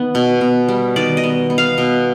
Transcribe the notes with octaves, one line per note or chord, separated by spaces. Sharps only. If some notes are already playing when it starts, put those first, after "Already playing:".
Already playing: D#3 B3
B2
B2
G3
D#3 D5
D#5
B3
B3
F5
B2